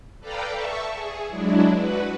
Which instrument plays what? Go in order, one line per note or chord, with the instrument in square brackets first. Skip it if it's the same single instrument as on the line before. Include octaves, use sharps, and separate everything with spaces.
[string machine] A4 B4 D5 F5 G5 A#5
E5 A5 C#6
G#4
F#3 G#3 D4 E4
F#4 B4